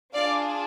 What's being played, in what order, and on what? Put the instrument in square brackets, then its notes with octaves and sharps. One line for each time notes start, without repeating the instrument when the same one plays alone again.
[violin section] D4 F4 G#4 D5 F5